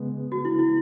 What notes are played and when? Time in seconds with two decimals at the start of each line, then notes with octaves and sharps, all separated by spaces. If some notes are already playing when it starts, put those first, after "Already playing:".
Already playing: C#3 G#3 B3
0.32 F#4
0.45 E4
0.59 E4